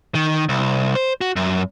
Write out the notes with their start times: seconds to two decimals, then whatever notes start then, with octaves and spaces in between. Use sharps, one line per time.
0.15 D#3
0.49 C2
0.95 C5
1.21 F#4
1.36 F#2